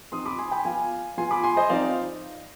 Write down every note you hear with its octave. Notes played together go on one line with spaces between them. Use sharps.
F3 C4 D#4 C6 D#6
B5 D6
G#5 C6
G5 B5
F3 B3 F4 F5 G#5
F3 B3 F4 G#5 C6
B5 D6
G#5 C6
C5 D#5
F3 C4 D#4 D5 F5